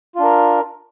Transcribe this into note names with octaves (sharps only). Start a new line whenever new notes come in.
D4 F4 A#4